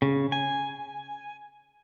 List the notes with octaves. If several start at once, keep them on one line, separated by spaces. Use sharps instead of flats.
C#3
G#5